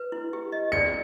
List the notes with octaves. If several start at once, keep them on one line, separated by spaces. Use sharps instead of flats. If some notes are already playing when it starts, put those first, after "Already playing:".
Already playing: B4
E4
G4
D#5
D5 C#7